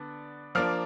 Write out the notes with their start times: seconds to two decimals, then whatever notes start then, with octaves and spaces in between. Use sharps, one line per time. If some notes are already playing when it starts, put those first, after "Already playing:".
Already playing: D3 B3 D4
0.55 F3 A#3 D4 F6